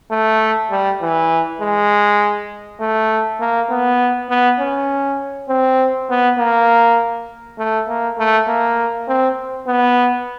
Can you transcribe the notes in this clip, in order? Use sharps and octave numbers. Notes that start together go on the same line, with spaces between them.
A3
G3
E3
G#3
A3
A#3
B3
B3
C#4
C4
B3
A#3
A3
A#3
A3
A#3
C4
B3